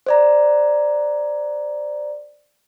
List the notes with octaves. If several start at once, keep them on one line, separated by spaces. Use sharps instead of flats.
C5 D5 A#5